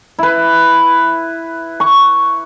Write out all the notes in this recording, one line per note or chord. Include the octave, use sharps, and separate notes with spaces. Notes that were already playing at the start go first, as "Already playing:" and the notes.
E4 B4
C#6